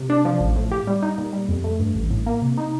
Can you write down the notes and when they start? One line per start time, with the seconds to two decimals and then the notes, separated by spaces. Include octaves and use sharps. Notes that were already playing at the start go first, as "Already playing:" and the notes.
Already playing: C3
0.10 D4
0.25 F3
0.40 A1
0.56 A2
0.71 G4
0.87 G3
1.03 D#4
1.18 A#2
1.33 G3
1.49 F2
1.64 A3
1.79 G2
1.95 A1
2.10 A2
2.26 A#3
2.42 C3
2.57 D#4